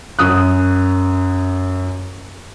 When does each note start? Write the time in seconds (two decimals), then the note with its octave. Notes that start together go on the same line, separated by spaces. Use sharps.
0.19 F#2 D#6 F#6